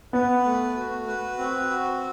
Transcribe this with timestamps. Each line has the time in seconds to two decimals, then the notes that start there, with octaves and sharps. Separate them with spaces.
0.13 B3 B4
0.45 A3
0.76 F#4
1.07 B4
1.39 C4
1.70 F#4